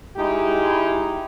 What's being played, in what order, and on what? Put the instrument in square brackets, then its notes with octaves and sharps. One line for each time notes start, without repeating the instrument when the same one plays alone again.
[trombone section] G#3 D#4 E4 G4